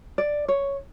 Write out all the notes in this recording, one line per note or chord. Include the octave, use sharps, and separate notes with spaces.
D5
C#5